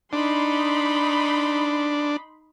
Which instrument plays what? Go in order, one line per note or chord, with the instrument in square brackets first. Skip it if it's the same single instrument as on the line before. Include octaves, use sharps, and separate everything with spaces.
[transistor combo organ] D4 [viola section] D#4 B5 C6